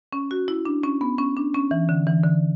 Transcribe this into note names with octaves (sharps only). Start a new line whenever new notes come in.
C#4
F#4
E4
D4
C#4
B3
C#4
D4
C#4
E3
D3
E3
D3